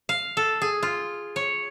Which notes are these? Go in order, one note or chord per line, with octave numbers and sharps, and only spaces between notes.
F5
A4
G#4
F4
C#5